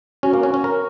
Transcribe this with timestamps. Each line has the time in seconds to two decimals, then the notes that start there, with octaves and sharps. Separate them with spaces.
0.23 C#4 F#4
0.33 A#3
0.43 C#4
0.54 C#4
0.64 A#4